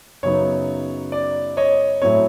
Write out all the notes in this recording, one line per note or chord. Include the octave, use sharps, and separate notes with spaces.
F#2 C#3 F#3 B3 D#4 C#5
D5
C#5 D#5
A2 F#3 A3 C4 E4 C#5